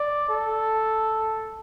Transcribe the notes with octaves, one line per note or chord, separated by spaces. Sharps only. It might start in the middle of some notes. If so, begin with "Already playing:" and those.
Already playing: D5
A4